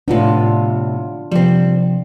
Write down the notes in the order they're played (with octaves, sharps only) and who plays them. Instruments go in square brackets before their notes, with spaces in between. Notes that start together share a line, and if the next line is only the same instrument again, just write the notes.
[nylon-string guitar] A2 C3 B3 [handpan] D4 F4
[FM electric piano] C3 F3 [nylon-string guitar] G3 C4